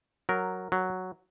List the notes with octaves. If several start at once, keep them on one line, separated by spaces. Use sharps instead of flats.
F#3 A#4
F#3